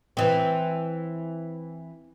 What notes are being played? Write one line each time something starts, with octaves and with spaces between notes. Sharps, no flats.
E3 C4